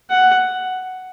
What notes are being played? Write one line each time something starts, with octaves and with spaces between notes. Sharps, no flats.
F#5